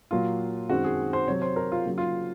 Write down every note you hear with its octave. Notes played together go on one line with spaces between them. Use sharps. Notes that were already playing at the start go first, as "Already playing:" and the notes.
A#2 F#3 A#3 F4
F#2 D#3 G#3 C4 F#4
G#4
C5
C3 F#3 C4 C#5
C5
A#4
F4
C#3 F#3 A#3
F4